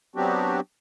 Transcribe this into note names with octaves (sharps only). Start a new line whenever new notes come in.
F#3 B3 C4 D4 F#4 G4